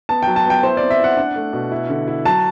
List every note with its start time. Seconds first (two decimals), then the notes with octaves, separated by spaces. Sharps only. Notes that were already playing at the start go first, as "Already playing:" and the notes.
0.09 B3 A5
0.23 F#3 G5
0.36 A5
0.45 B3 G5
0.63 E4 C5
0.77 C4 D5
0.90 E5
1.00 E4 F#5
1.17 D4
1.36 A3
1.53 B2
1.72 E4
1.90 D3
2.08 E4
2.25 F#3 A5